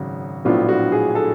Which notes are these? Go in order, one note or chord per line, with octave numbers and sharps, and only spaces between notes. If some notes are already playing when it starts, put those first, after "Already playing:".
Already playing: G#1 F#2 C#3 F#3 F#4
A#1 A2 F#3 B3 D4 F4
F#4
G#4
A4